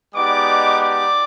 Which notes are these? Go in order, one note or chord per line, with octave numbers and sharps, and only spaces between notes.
G#3 B3 D#4 G4 D5 D6
D5 D6